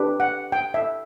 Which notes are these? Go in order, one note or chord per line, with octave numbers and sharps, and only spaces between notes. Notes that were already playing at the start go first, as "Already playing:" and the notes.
Already playing: D4 G4 B4
F#5
G5
E5